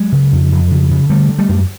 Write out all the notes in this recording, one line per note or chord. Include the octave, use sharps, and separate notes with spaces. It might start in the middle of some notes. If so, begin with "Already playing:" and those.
Already playing: F#3 G#3
C#3
F2
F2
C#3
C#3
D3 G3 A3
D3
G3 A3
F#2